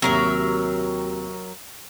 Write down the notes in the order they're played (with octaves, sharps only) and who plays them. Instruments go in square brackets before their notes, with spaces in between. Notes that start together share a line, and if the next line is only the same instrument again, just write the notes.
[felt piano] D#2 C3 [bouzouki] F#3 A#4 E5